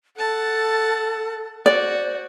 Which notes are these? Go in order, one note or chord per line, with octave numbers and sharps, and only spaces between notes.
A4 F#5 A5
F#4 C5 D5